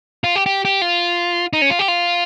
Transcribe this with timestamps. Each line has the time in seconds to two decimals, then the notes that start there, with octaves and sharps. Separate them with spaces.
0.24 F4
0.36 G4
0.46 G4
0.65 G4
0.82 F4
1.53 D#4
1.62 C#4
1.70 F4
1.79 G4
1.88 F4